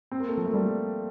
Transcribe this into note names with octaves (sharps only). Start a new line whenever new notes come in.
C4
A#3
A3
F3
A3
G3